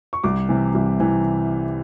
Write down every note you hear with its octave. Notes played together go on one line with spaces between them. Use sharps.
C#6
C2 D6
C3 E3
C2
C3 E3